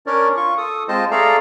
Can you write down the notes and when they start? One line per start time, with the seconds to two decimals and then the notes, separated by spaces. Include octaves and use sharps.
0.07 C#4 D4 A#4 C#5 D5
0.37 F4 C#6
0.58 A4 D#6
0.88 G#3 C4 F4 C5 D#5 A5
1.11 A3 G#4 A4 D5 F5 A#5